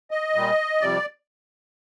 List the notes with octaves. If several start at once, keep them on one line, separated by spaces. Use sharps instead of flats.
D#5
A#2 G3
F2 C3 G3 D5